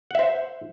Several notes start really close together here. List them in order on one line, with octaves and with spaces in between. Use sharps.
F#5 E5 C5